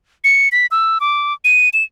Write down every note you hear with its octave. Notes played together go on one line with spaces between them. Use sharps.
C#7
B6
E6
D6
D#7
E7